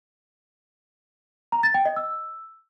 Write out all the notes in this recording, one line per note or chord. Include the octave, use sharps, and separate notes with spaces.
A#5
A6
G5
D#5
E6